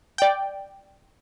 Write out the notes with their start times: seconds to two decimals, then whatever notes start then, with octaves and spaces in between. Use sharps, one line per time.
0.18 D5 G5